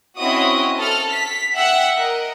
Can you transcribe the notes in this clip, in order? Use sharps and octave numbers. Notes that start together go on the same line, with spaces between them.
C4 C#4 E4 F#4 D#5 D#6
A4 F6
B6
E5 F#5 G5 E6 F#6
A#4 D#5